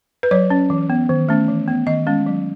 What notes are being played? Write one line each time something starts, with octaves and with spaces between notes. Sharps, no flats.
B4
F#3 C#5
C#4
E3
B3
D#3
A3 C#4
E3
B3
D#3 D#5
G#3 C#4
F#3